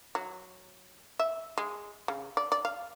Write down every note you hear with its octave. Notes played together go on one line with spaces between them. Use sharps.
F#3
E5
G#3
C#3
D5
D5
F5